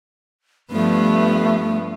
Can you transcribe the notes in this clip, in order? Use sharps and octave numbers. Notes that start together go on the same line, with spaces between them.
G2 F3 A3 B3